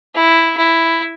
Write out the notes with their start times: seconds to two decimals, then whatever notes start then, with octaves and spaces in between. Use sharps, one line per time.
0.15 E4
0.57 E4